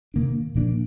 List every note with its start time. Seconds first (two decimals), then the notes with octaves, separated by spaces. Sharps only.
0.14 C3 D#3 A#3 D4
0.55 A#2 F3 A#3 D4